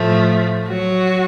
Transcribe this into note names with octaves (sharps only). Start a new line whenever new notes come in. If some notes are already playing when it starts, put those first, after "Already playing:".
Already playing: A2 F3 A3
F#3 F#4